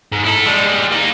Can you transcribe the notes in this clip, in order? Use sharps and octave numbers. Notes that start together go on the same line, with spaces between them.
G#2
E4 A4
G3 G#3
A#3 D#4